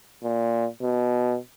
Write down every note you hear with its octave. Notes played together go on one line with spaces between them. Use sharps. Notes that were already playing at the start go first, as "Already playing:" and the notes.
A#2
B2